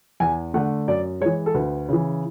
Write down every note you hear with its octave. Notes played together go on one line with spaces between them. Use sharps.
E2 G#5
D3 A3 F#5
F#2 D5
E3 G#3 C#5
A4
D2 B4
C#3 E3